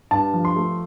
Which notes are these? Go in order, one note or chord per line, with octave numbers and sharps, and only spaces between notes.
G2 A5
F3
C6
A3